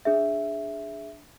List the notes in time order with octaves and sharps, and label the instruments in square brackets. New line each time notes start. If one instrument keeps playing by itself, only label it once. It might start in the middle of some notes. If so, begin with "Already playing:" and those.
[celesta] D4 G#4 E5